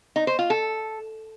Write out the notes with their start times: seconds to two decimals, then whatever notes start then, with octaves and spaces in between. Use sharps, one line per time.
0.16 D#4
0.27 C5
0.39 F4
0.50 A4